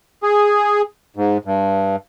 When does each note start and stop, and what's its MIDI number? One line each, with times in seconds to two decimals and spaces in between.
0.23 0.82 68
1.16 1.37 44
1.45 1.96 43